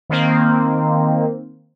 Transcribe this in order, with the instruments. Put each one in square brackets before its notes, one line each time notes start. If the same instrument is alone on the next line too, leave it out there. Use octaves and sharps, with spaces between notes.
[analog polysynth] D#3 A#3 C4